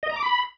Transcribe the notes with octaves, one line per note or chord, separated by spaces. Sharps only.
D#5
A#5
D6
B5